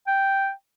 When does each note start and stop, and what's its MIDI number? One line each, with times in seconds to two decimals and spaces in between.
0.07 0.51 79